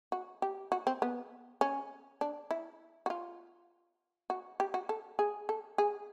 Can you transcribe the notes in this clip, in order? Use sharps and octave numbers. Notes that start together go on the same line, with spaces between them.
F#4
G4
F#4
C4
B3
C#4
D4
E4
F#4
F4
F#4
G4
F#4
A4
G#4
A4
G#4